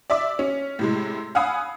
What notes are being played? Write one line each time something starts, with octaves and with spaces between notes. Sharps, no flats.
D5 E5 D6
C#4
A2 C3 G#3
F5 F#5 G#5 B5 D#6 E6